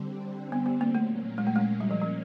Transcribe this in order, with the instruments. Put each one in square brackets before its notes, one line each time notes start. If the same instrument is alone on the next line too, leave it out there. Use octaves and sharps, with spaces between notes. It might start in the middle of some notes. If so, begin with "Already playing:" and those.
Already playing: [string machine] D3 G3 C4
[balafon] B3
B3
A#3
[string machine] A#2 F#3 A#3 C#4 [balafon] A3
[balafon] G#3
A3
G#3
G3
F3
F3